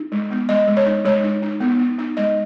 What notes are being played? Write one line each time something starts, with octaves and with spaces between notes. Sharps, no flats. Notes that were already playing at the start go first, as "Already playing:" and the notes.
Already playing: D#4
G#3
B3
G#3 D#5
G#3
C#5
D#4
G#3 C#5
D#4
D#4
B3
D#4
D#4
G#3 D#5